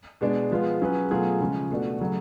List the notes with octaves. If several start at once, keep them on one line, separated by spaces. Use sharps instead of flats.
B2 G#3 D4
F3 G#3 B3 F4
F#3 C#4 G#4 B4
B2 F#3 A3 F4 G#4
C#3 F3 G#3 C#4
B2 A3 D4 F#4
C#3 F#3 A3